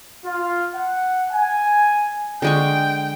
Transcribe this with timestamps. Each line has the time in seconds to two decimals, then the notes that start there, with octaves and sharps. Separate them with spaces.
0.25 F4
0.74 F#5
1.32 G#5
2.42 D3 G#3 G5 C#6